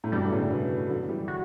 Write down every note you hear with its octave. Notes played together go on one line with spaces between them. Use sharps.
A2
G2 B2 G3
D3
A2 C#3
A3
B2 D3 B3
D3 F#3
E3 G3
F#4